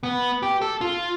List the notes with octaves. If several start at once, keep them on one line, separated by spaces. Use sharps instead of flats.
B3
G4
A4
F4